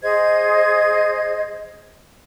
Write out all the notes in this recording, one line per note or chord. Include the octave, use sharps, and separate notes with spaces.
G#4 C5 D#5 G#6